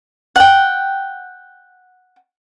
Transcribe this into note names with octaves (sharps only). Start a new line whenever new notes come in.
F#5 G5